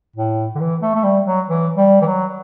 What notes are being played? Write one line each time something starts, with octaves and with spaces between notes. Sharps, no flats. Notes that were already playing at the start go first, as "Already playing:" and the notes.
A2
D3
E3
A3
A3
G3
F#3
E3
G3
E3
F#3